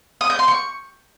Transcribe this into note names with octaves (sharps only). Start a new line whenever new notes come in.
D#6
G6
C6
C#6